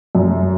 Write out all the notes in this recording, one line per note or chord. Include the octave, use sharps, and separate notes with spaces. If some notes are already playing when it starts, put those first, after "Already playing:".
F#2